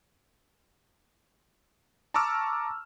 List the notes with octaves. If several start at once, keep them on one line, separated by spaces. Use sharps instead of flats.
A5 A#5 C#6 D6 E6 F6